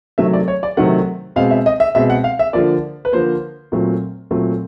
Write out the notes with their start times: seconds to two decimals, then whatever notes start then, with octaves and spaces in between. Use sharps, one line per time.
0.18 C3 D#3 F#3 A3 E5
0.33 D5
0.48 C#5
0.63 D5
0.77 C3 D#3 F#3 A3 F#5
1.36 B2 G#3 C4 F5
1.51 E5
1.66 D#5
1.80 E5
1.95 B2 G#3 C4 E5
2.10 F#5
2.24 F5
2.39 E5
2.53 D3 F3 A#3 D5
3.05 B4
3.13 D3 F3 A#3 C5
3.72 A#2 F#3 A3 C4
4.31 A#2 F#3 A3 C4